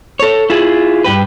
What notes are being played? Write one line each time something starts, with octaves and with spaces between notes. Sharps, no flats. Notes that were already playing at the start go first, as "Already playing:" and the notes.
A4 C#5
E4 F4 G#4
G2 G4 B4